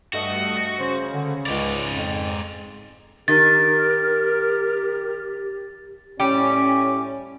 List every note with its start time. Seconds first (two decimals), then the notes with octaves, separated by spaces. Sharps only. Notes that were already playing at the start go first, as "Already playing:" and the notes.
0.13 G2 A3 F#4 D#5
0.79 C#3 C5
1.11 D3
1.46 C#2 G#2 G#3 D5
1.90 F2
3.28 D#3 G4 A#4 A6
6.20 A2 G3 C#4 G4